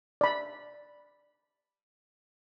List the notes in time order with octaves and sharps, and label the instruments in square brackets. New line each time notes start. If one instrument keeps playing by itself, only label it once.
[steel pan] D5 B5